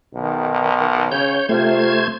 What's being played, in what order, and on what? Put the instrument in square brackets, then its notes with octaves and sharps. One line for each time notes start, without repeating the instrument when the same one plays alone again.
[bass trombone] B1 [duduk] D#3
[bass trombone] C#3 [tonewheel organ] C#5 G6
[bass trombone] C3 [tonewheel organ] A3 C5 G#6 [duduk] F4